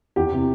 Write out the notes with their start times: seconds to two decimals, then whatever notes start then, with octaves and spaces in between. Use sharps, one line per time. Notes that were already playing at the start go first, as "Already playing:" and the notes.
0.16 E2 G4
0.32 C3